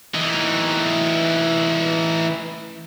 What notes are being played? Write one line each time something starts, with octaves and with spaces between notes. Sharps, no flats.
E3 D#4